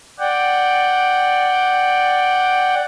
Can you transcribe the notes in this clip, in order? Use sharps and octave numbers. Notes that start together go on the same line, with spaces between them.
D5 F#5 G5